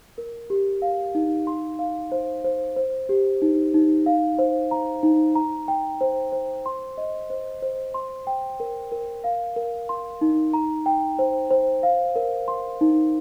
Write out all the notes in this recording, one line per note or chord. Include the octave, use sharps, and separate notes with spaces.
A#4
G4
F5
D#4
C6
F5
C5
C5
C5
G4
D#4
D#4
F5
C5
A#5
D#4
A#5
G5
C5
C5
C6
D#5
C5
C5
C6
G5
A#4
A#4
F5
A#4
C6
D#4
A#5
G5
C5
C5
F5
A#4
C6
D#4